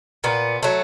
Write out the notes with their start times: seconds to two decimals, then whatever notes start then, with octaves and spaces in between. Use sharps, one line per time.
0.24 A#2 B3
0.63 F#3 A3